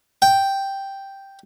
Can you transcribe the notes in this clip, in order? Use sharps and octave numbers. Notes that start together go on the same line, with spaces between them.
G5